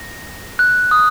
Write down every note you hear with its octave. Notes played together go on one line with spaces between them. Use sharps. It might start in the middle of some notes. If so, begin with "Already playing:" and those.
Already playing: A#6
F#6
D#6